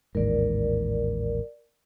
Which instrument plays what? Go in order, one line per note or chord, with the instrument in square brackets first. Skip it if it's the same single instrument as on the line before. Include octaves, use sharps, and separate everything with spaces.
[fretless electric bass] A1 D#2 G#2 [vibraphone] A#4 D5